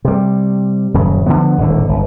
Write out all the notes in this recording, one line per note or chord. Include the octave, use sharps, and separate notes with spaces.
C3 G3
D#1 F#2 C#3
D3 F3 B3
D#1 G#1 A2 D3
G1